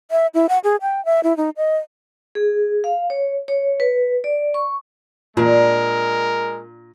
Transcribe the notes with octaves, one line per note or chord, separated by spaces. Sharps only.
E5
E4
F#5
G#4
G5
E5
E4
D#4
D#5
G#4
F5
C#5
C#5
B4
D5
C#6
A#2 G#3 D4 A#4